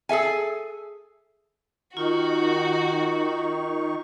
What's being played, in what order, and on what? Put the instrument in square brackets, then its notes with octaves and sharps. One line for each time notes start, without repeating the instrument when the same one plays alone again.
[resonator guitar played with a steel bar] G#4 A4 E5 G#5
[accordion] D#3 D#4 C#6 [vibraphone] F4 [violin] F#4